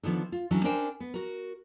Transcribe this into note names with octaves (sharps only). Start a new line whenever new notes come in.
D3 D#3 F3 B3
F4
D3 E3 F#3 C#4
C#4 D4 A#4 C5 G5
B3
F#4 A#4